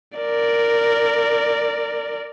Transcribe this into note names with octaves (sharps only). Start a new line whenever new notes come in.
A#4 D5